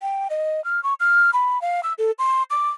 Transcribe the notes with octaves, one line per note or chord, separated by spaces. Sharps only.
G5
D#5
F6
C#6
F6
B5
F5
E6
A4
C6
D6